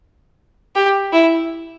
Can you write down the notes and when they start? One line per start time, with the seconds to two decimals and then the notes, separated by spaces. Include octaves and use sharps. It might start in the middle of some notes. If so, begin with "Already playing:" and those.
0.76 G4
1.13 E4